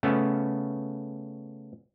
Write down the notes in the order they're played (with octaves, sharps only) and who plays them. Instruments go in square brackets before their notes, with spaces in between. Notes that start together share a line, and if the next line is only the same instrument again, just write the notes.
[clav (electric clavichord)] C#3 A3 B3 C#4